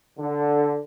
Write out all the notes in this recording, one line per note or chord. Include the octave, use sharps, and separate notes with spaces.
D3